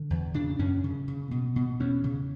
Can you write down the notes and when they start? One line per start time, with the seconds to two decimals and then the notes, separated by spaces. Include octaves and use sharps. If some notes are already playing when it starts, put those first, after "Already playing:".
Already playing: D3
0.10 E2
0.34 C#3 D4
0.59 F#2 C#4
0.84 C#3
1.08 C#3
1.31 B2
1.56 B2
1.80 E2 C#4
2.04 C#3